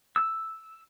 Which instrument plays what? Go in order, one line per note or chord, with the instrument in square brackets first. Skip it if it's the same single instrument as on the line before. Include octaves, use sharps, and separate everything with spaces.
[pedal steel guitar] E6